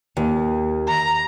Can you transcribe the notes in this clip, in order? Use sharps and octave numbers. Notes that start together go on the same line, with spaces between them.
D#2
A#5